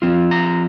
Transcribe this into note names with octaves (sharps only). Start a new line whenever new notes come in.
F3 C4 F4
A#5